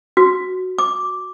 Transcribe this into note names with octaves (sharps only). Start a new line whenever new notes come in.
F#4
D6